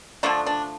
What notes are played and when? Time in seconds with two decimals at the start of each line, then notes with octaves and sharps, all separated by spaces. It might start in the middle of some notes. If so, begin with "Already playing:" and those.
0.23 D3 F3 A3 D4
0.47 D4